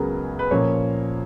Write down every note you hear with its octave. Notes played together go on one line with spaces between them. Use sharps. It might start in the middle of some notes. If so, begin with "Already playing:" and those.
Already playing: C#2 C#3 F#3 B3 G#4 A#4
B4
A#2 F3 A#3 C#4 C#5